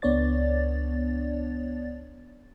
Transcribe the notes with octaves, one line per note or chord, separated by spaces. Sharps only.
C#2 B3 D4 C#5 D5 A6